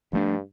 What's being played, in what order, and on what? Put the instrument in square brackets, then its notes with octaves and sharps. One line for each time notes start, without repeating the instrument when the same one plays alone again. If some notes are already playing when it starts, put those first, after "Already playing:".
[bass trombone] G2 [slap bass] F3 A3 D4